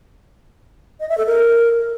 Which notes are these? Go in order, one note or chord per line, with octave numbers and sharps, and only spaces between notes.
D#5
E5
A4
A#4